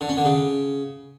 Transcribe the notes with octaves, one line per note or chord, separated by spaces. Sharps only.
D3
C#4
D3
C#3